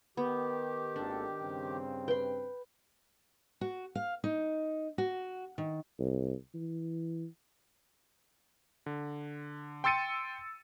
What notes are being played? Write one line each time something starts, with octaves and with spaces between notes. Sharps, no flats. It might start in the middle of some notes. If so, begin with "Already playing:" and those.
D#3 B3 G4
G#1 A#3 D4 A4
G2 C#3 C4
B4 G5 C6
F#4
F5
D#4
F#4
D#3
C2
E3
D3
G5 C6 E6 A6 C#7 D#7